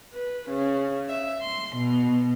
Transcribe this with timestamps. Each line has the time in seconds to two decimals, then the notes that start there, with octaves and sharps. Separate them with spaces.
0.13 B4
0.49 C#3
1.08 E5
1.43 C6
1.76 B2